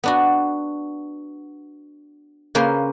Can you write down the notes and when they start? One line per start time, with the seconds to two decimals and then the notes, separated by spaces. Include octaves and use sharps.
0.04 B3 D4 F#4
2.55 C#3 A#3 C#4 B4 C5